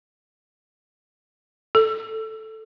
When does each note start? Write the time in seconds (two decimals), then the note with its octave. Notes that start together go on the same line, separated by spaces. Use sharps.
1.75 A4